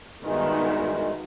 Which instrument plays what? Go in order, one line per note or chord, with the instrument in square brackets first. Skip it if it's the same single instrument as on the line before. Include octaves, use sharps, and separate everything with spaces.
[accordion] G2 E3 G#3 [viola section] D#3 B3 F#4